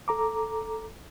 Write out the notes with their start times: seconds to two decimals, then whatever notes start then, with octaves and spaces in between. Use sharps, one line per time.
0.08 A4 A#5 D6